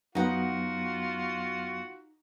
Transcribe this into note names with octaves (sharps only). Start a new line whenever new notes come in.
F#2 F#3 B3 D#4 F4 F#4 F#5